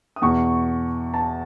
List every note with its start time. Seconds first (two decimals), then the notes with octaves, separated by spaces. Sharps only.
0.16 D#6
0.22 E2 B2 C#6
1.14 A5